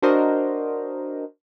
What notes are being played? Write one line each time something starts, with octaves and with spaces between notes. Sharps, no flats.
D4 F#4 A#4 C5 D#5